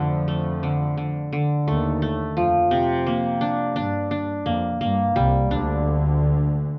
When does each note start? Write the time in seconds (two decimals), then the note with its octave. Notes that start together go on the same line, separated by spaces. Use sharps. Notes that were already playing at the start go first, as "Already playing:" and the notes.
Already playing: F2 D3 F3 A3
0.28 A3
0.63 D3
0.97 D3
1.33 D3
1.67 D#2 D#3 A3
2.02 A3
2.37 F2 F3
2.71 C3
3.07 A#3
3.41 D4
3.76 G2 D4
4.11 D4
4.46 F2 A#3
4.81 G2 A#3
5.16 C2 C3 G3
5.50 D2 D3 D4